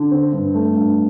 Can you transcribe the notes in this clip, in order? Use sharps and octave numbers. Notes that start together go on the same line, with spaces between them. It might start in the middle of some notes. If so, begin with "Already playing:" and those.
Already playing: D3
C4
G2
A3
G2